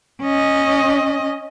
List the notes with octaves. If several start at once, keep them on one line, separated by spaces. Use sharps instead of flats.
C#4 D#5